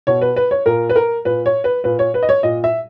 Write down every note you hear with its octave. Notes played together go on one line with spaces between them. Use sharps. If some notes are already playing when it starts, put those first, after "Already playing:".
B2 C#5
B4
B4
C#5
A#2 A#4
B4
A#4
A#2 B4
C#5
B4
A#2 B4
C#5
B4
D#5
C#5
A#2 D#5
E5